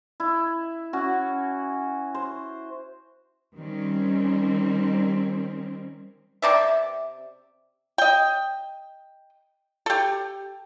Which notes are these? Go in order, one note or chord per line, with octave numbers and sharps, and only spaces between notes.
E4
C#4 F#4
C5
D#3 G3 C4 C#4
C3 D#4 D5 E5
D#5 G5
G4 A4